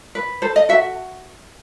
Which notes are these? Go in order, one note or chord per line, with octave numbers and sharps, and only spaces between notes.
B4
A4 C5
D#5
F#4 E5